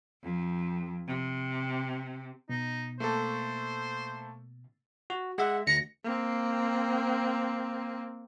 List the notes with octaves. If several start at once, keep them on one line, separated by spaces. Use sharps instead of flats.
F2
C3
B2 D#4
A3 A#3 A4 C5
F#4
G#3 E5 F#5
D2 A#6 C#7
A#3 C4